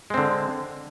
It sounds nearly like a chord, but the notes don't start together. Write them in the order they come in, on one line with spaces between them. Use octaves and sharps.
G#3 C4 D3